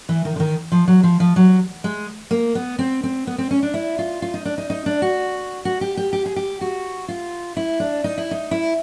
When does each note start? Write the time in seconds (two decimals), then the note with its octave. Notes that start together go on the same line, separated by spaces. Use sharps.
0.09 E3
0.25 D#3
0.36 D3
0.40 D#3
0.72 F3
0.88 F#3
1.03 F3
1.20 F3
1.36 F#3
1.84 G#3
2.31 A#3
2.55 B3
2.79 C4
3.03 C4
3.27 B3
3.38 C4
3.51 C#4
3.63 D4
3.74 E4
3.99 F4
4.22 F4
4.34 D#4
4.45 D4
4.58 D#4
4.70 D#4
4.86 D4
5.02 F#4
5.65 F#4
5.81 G4
5.97 G4
6.13 G4
6.26 G#4
6.36 G4
6.61 F#4
7.08 F4
7.57 E4
7.80 D4
8.04 D#4
8.18 E4
8.31 D#4
8.51 E4